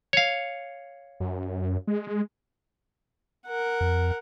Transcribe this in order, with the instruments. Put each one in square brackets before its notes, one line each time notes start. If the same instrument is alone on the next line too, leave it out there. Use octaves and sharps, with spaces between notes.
[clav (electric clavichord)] C#5 F5
[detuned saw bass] F#2
G#3
[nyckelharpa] A#4 F#5
[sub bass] F2